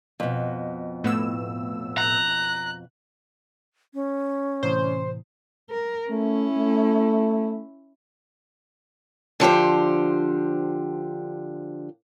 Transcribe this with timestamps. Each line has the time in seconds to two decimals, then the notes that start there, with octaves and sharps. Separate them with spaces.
0.20 F2 B2
1.04 A2 B3 E6
1.98 A#5 F#6
3.94 C#4
4.63 A2 C3 E3 C5
5.70 A#4
6.10 A3 C#4 E4
6.58 A3
9.40 D3 F3 G4 C5